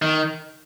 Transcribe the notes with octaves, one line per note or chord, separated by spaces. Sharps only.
D#3